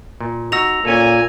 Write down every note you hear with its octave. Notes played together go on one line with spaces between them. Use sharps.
A#2
D#4 F#4 E6 A#6 F7
A#2 C#4 A4 G#5